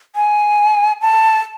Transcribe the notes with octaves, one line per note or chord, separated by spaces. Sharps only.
G#5
A5